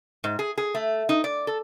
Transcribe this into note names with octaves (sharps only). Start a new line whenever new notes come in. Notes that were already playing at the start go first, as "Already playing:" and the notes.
G#2
G#4
G#4
A3
D#4
D5
A4